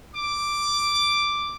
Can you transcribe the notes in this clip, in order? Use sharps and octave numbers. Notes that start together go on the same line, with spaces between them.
D6